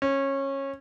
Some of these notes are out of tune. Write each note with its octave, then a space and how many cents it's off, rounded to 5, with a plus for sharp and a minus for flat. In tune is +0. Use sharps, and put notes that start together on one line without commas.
C#4 -20